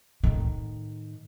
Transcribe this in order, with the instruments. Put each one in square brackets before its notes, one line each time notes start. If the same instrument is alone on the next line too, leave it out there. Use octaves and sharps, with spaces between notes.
[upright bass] A2 D#3